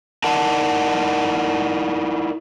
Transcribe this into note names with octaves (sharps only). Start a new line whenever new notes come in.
D#4 E4 A#4 D5 F#5 A5